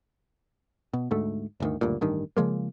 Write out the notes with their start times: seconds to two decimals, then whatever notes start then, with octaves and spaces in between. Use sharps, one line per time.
0.94 B2
1.11 D2 G#2 A3
1.60 G1 D2 D#3
1.81 F#1 D2 G2 A#2
2.01 A1 G2 D#3
2.37 C#3 F3 G#3 A#3